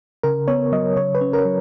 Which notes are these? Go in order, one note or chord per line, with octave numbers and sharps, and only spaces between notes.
C#3 A#4
B3 C#5
F#3 D#5
C#3 C#5
B4
C#4
A#4
F#3